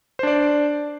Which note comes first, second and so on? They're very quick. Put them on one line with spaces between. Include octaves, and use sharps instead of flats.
C5 D4 D5